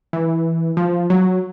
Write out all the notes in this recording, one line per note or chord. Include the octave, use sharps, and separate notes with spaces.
E3
F3
F#3